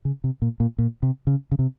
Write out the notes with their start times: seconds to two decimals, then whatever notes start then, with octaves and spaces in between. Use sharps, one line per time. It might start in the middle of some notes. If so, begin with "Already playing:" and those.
0.05 C#3
0.24 C3
0.42 A#2
0.60 A#2
0.78 A#2
1.03 C3
1.27 C#3
1.51 C#3
1.59 C3